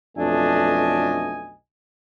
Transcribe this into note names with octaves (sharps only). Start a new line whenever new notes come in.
B1 F2 A3 D4 D#5 G#5